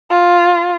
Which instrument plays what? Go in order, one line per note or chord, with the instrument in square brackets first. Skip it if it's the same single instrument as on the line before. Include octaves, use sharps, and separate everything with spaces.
[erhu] F4